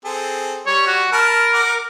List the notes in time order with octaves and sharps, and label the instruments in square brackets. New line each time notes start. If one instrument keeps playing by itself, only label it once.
[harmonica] C4 G#4 A4
[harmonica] G3 [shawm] C#5
[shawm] F#4
[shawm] A#4 [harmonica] A5 B5 F6
[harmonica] F#5 D6